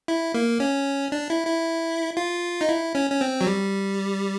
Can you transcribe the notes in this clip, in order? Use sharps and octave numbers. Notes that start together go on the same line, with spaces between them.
E4
A#3
C#4
D4
E4
E4
F4
D#4
E4
C#4
C#4
C4
F#3
G3